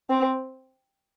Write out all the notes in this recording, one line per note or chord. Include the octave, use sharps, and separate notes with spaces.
C4